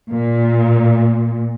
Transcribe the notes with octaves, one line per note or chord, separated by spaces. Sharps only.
A#2